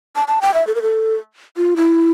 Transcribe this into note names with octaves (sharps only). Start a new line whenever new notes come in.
A5
A5
G5
E5
A4
A#4
A4
F4
E4